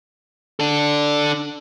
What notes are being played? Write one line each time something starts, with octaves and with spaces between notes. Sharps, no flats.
D4 A4